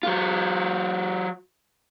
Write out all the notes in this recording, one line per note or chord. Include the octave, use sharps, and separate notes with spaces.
F#3 F4